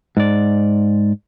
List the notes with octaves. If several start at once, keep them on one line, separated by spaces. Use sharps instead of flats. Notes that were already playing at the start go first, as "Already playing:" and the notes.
G#2 D5